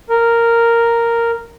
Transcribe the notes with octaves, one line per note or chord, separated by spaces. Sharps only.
A#4